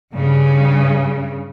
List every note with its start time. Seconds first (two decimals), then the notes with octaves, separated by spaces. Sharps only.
0.13 G2 C#3